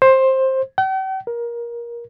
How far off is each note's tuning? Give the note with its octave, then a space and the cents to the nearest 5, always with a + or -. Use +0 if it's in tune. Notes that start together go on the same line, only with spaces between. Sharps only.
C5 +15
G5 -45
A#4 +20